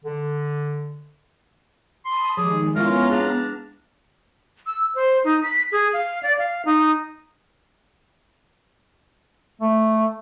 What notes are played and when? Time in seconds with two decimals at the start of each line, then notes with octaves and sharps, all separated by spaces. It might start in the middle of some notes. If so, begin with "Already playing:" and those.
0.04 D3
2.05 A5 B5 C6 D#6
2.37 D#3 F3 G#3 G4 G#4 D6
2.76 G#3 B3 C#4 E4 F4 A#4 A#5 F6
3.10 D4 G#4 F5
4.67 E6
4.95 C5
5.24 D#4
5.43 B6
5.72 G#4
5.93 F5
6.23 D5
6.39 F5
6.65 D#4
9.61 A3